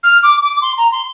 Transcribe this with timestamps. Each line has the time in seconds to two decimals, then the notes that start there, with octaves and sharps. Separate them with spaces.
0.04 F6
0.23 D6
0.43 D6
0.62 C6
0.78 A#5
0.92 C6